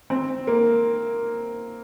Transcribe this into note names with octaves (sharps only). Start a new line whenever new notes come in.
C4
A#3